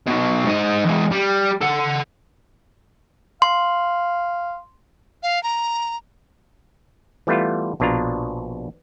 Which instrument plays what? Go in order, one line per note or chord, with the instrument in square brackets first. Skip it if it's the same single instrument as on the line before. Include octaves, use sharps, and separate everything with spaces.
[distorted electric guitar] B2 F#3
G#2 D#5
E3 G#3
G3
A4 F#5
[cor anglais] F5 [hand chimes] C6
[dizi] F5
A#5
[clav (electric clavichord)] E3 G3 A3 B3 F4
A#1 B2 D4 F4 A#5